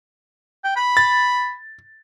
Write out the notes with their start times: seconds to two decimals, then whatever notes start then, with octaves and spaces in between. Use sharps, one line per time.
0.64 G5
0.76 B5
0.97 A6